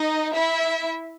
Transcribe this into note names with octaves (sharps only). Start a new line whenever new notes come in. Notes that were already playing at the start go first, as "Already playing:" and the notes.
Already playing: D#4 D#5
E4 E5